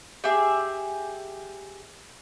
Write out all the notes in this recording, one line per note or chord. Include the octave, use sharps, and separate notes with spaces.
G4 G#4 E5